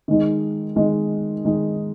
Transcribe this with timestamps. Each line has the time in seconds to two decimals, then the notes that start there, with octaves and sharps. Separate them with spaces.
0.08 D#3 G#3 D#4
0.76 D#3 G#3 D#4
1.45 D#3 G#3 D#4